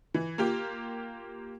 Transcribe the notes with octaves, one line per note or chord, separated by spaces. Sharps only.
E3
A#3 F4 G4